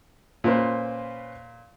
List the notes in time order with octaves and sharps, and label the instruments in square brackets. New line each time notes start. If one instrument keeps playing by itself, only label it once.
[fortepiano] A#2 [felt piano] C#4 B4 C5